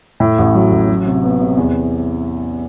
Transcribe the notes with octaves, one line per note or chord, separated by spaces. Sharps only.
A2
A1
F#3
A1
F#3
C3
B3
C3
E2